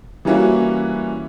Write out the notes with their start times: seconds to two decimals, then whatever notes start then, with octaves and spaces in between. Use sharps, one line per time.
0.25 E3 G3 A#3 C#4 E4 F#4